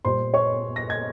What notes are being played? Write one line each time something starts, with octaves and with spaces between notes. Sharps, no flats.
A#2 G3 C5 C6
C#5 C#6
A#6
G#6